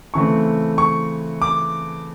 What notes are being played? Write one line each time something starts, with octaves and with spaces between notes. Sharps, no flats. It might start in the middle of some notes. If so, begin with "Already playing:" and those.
C#3 E3 A3 C4 C#6
C#6
D6